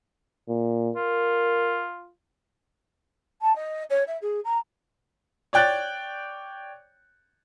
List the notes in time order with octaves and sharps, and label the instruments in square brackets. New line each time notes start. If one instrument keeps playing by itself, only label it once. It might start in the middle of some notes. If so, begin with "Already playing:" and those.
[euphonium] A#2
[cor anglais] F4 [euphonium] A#4
[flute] A5
D#5
C#5
E5
G#4
A#5
[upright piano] C#5 D5 G5 F#6 A6